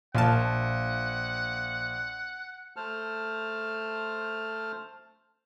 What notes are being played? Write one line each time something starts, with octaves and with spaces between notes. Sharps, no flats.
A#1 A#2 F5 F#5 A5 F6
A3 C5 A5 F6